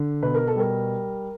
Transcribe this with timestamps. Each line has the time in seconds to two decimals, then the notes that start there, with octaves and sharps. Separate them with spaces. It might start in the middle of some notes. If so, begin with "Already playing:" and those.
Already playing: D3
0.23 B2 B4
0.34 A#4
0.47 A4
0.56 G3 A#4